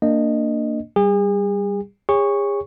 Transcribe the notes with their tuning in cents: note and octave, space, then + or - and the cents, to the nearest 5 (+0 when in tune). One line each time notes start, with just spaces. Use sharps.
A#3 -20 D4 +0 D#5 -15
G3 +0 G#4 -40
G#4 -40 C#5 +0 C#6 +0